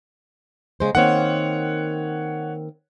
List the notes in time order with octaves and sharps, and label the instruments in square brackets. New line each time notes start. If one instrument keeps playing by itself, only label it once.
[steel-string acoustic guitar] C#3 G#3 C5
[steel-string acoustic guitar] D#3 A#3 C4 [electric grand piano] C#5 F#5